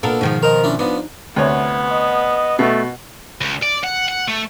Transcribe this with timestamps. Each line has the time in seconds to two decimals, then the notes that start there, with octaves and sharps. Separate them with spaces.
0.03 A#2 B3 D4 A4 A#4
0.21 G#2 B2 D#3 F3
0.43 A#4 C5 D#5
0.64 C#4 D4 E4
0.79 F3 B3 D4 D#4
1.36 D2 C3 B3 C#5
1.91 D#5
2.59 B2 A3
3.41 C#2
3.62 D5
3.84 F#5
4.08 F#5
4.28 A3